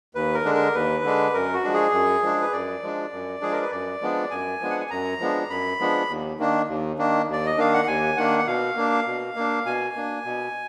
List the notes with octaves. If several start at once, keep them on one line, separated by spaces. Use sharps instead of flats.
D#2 B4
A#4
D3 G#3 D4
A#4
D#2 B4
D3 G#3 D4
F#2 A#4
F#4
F3 G#3 D4
G#4
F#2
F3 G#3 D4
B4
F#2 D5
F3 G#3 D4
F#2
F3 G#3 D4 G#4
A#4
B4
F#2 D5
F3 G#3 B3 D4
F#2 G#5
F3 G#3 B3 D4
F#5
G#5
F#2 A#5
F3 G#3 B3 D4
F#2 B5
F3 G#3 B3 D4
D#2
D#3 A#3 D4
D#2
D#3 A#3 D4
D#2 D5
D#5
D#3 A#3 D4 F5
F#5
D#2 G#5
D#3 A#3 D4 F#5
F#5
B2 F5
A#3 D4
B2
A#3 D4
B2 G#5
A#3 D4
B2